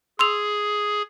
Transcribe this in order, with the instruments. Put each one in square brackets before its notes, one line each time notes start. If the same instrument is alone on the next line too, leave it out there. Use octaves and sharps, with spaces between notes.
[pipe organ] G#4 [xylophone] C6 E6 F7